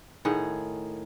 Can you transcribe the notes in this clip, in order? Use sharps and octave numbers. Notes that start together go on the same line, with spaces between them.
A2 D#3 G#4 F#5